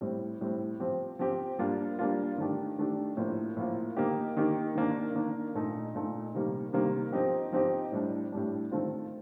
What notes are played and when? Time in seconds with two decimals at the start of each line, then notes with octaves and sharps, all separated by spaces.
0.01 A2 G3 C4
0.41 A2 G3 C4
0.80 F3 C4 G4
1.19 F3 C4 G4
1.59 G3 A#3 D4 F4
1.99 G3 A#3 D4 F4
2.38 D#3 A3 D4 G4
2.78 D#3 A3 D4 G4
3.17 A2 F3 A#3 F4
3.56 A2 F3 A#3 F4
3.97 D#3 A#3 D#4 G4
4.37 D#3 A#3 D#4 G4
4.75 D#3 A#3 D4
5.15 D#3 A#3 D4
5.55 A#2 A3 D#4
5.95 A#2 A3 D#4
6.34 C3 D#3 G3 A#3
6.73 C3 D#3 G3 A#3
7.12 F3 C4 D#4 G4
7.52 F3 C4 D#4 G4
7.92 A2 G3 D4
8.32 A2 G3 D4
8.72 D#3 A3 C4 F4